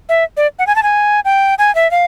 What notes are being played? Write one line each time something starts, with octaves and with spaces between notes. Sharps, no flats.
E5
D5
F#5
G#5
A5
G#5
G5
G#5
E5
F5